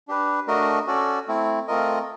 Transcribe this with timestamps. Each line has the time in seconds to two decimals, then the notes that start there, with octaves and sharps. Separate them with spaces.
0.08 D4 G4 B4
0.47 A3 D4 F#4 A#4 D#5
0.87 C#4 F#4 A4 D5
1.28 A3 C4 E4
1.67 A3 C4 F4 A#4 D#5